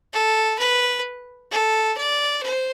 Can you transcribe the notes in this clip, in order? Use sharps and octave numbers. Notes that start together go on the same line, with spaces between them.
A4
B4
A4
D5
C5